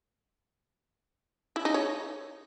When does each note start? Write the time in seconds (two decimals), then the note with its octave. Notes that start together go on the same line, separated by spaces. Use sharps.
1.56 E4
1.65 D#4
1.74 C#5